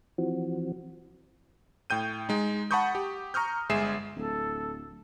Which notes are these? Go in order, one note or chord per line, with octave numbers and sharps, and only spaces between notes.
E3 F3 C4 F#4
A2 G5 G6 D#7
G#3 D#4
F#5 A5 B5 C#6 D#6 G6
G4
A#5 C#6 D#6 F6 G6
G1 G#3 G#4 E5 C7 E7
D1 A4